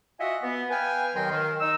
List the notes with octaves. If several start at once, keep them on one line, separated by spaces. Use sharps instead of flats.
F4 F#4 D#5 E5 F#5 G#5
B3
B4 F5 G5 G#5
D#2 D#3 F#3 D#5 G5 C6
D#3
D#4 E6